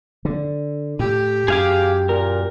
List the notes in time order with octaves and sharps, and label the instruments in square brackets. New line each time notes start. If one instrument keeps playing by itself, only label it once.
[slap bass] D3
[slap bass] A2 [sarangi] G4
[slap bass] F#2 [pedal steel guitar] G#4 F5 D6
[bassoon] A#2 [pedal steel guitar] A#4